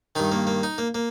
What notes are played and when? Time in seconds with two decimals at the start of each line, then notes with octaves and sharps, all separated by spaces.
0.16 G2 D#3 D#4
0.32 A#3
0.47 A#3
0.63 D#4
0.78 A#3
0.95 A#3